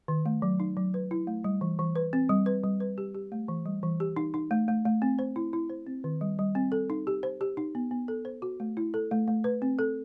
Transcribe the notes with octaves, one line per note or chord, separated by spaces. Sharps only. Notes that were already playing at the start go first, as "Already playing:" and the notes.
D#3
A3
F#3
D#4
F#3
B4
E4
A3
G3
E3
E3
B4
C4
G3
B4
G3
B4
G4
G4
A3
E3
G3
E3
G4
D#4
D#4
A3
A3
A3
C4
C5
E4
E4
C5
C4
D#3
G3
G3
C4
A4
D#4
G4
C5
G4
D#4
B3
B3
A4
C5
F#4
A3
E4
A4
A3
A3
B4
C4
A4